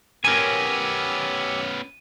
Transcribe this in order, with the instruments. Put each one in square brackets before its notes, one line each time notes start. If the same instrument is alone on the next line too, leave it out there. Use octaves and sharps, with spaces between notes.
[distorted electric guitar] B3 C#4 [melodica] G4 E6 [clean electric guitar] A#4 G#5 [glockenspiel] D#7